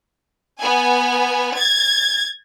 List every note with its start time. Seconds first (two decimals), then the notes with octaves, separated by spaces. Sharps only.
0.61 B3 G#5
1.56 G#6 A6